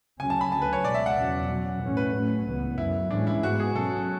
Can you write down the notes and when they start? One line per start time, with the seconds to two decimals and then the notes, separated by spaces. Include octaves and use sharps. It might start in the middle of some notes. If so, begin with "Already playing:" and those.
0.19 D2 C#3 F#3 C#4 G#5
0.30 A5
0.41 B5
0.51 D2 D3 F#3 A5
0.62 B4
0.73 C#5
0.84 C#2 B2 G#3 D5
0.94 E5
1.06 F#5
1.17 E2 C#3 F#3 C#4
1.48 B2 F#3 C#4
1.81 A2 E3 A3 C#4
1.97 B4
2.14 A2 F#3 A3 C#4
2.46 C#2 C#3 E3 B3
2.78 F#2 C#3 F#3 E4
3.11 A2 E3 G#3 C#4 D4
3.27 E4
3.43 G#2 G#3 B3 F#4
3.60 G#4
3.75 B2 F#3 C#4 A4